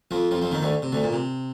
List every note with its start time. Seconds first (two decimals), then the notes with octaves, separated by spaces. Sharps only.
0.11 F2 F3
0.31 F2 F3
0.41 F2 F3
0.52 D#2 D#3
0.62 D2 D3
0.82 C3
0.92 D2 D3
1.03 A#2
1.13 C3